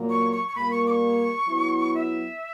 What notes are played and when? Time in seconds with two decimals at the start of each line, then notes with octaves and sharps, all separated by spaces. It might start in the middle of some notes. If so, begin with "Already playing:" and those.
Already playing: A#2 F#3 A#3
0.10 C#6
0.32 C#6
0.48 C#6
0.56 A#2 G3 A#3 B5
0.71 C#6
0.87 D6
0.90 C#6
1.48 F#3 B3 E4
1.94 E5